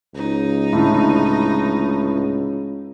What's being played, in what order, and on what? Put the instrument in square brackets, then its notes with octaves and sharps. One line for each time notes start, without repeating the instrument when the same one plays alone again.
[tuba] C#2 [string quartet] D#4
[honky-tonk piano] A2 D3